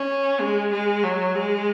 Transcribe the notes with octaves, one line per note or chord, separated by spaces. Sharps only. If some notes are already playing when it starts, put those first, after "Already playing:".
Already playing: C#4
G#3
G#3
F#3
G#3